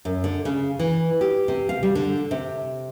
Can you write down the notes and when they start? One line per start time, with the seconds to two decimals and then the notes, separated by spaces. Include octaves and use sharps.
0.05 F#2
0.24 D3
0.45 C#3
0.79 E3
1.21 G4
1.48 C3
1.69 F5
1.83 G3
1.95 D3
2.31 C3